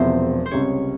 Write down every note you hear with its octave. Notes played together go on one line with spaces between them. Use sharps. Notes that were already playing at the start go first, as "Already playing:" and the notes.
Already playing: E1 E2 C3 F3 C4 C5 E5
C5
C#2 C3 G3 C#5